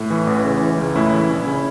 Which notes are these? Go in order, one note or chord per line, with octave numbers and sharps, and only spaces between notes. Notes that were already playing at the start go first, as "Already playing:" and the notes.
Already playing: A2
E3
A1
C#3
E3
C#2
A2 C#4 E4
E3
A#1
C#3